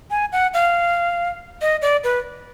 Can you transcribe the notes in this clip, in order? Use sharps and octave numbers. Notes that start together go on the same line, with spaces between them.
G#5
F#5
F5
D#5
D5
B4